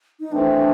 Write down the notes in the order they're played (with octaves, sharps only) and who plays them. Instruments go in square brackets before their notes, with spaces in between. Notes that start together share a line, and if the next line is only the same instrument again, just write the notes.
[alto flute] D#4
[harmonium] E3 A3 C4 [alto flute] D4